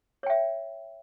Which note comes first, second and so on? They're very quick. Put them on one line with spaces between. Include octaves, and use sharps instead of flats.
C#5 G5 E5